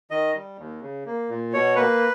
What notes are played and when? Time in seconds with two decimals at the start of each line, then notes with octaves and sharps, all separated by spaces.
0.11 D#3 D#5
0.34 G3
0.58 D#2
0.81 C#3
1.06 A#3
1.29 A#2
1.53 B2 C#5
1.76 A#3 B4